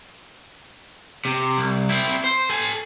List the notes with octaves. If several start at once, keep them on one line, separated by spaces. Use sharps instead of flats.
C3
C2
C4 E4
C5
A4 G#5